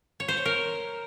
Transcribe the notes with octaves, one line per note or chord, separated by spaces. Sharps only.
C#5
C5
C#5
A#4